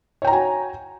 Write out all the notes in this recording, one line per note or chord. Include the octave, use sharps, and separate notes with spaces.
F#4 C#5 G5 G#5 A#5